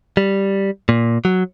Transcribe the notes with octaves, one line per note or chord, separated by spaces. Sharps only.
G3
A#2
F#3